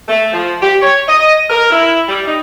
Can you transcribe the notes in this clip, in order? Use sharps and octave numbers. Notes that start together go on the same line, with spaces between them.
A3
F3
G4
C#5
D#5
A#4
E4
G3
D#4